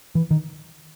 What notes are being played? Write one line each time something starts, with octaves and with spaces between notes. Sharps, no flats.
E3
D#3